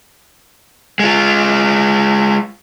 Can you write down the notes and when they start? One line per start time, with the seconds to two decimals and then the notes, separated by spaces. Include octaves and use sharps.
0.99 G#3 F4